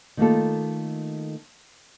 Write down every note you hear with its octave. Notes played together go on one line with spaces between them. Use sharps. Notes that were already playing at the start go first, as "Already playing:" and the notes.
D#3 A3 A#3 F4 A4